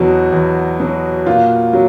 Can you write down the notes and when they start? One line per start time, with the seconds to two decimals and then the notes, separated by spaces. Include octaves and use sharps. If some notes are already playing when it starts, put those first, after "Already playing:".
Already playing: E2 B2 F#3 F#4
0.32 E2
0.79 B2 F#3
1.26 A#2 F4
1.73 F#3